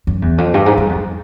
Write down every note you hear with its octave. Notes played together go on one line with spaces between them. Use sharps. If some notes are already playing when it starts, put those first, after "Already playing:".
F#2
E2
F2
G2
G#2
G2
F2